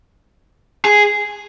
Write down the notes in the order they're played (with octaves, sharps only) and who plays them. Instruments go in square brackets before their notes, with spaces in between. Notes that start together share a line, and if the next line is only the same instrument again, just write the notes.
[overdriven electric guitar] G#4